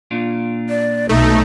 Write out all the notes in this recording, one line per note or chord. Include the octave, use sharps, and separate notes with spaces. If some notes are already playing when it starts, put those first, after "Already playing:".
A#2 D4 F4
D5
B1 A3 D#4